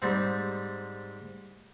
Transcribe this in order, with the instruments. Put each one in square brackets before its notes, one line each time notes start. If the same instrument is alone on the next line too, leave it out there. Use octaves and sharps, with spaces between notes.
[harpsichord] G#2 G3 C4